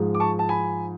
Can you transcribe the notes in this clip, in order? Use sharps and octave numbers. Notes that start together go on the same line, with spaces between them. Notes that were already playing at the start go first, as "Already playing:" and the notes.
Already playing: G#2 F3 G#3
D6
A5 C#6
A5
G#5 B5